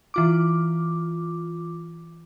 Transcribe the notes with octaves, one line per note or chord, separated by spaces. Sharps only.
E3 F4 D6